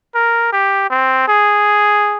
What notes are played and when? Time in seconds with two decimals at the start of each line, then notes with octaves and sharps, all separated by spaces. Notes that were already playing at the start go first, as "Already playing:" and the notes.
0.15 A#4
0.52 G4
0.90 C4
1.28 G#4